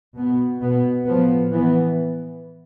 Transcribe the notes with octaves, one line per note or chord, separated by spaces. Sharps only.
B2 B3
B2 B3
A2 F3 B3
E3 B3